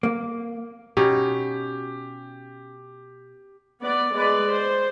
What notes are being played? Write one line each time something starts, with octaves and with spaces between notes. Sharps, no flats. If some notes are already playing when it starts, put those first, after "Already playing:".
A#3
B2 C#4 D#4 G4
B3 D5
G#3 B4 D5
C5